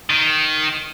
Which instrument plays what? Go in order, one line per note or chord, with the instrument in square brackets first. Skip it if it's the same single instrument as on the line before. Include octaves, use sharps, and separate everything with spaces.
[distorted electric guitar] D#3